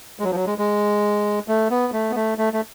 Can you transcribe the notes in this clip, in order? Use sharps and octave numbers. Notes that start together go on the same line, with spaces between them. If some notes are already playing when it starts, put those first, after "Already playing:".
G#3
F#3
F3
F#3
G#3
G#3
A3
B3
A3
B3
A3
A3
A3